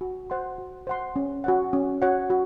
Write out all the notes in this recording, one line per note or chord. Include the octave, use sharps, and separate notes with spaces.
F#4
C5 F#5 C6
F#4
C5 F#5 C6
C#4
F#4 C#5 F#5
C#4
F#4 C#5 F#5
F#4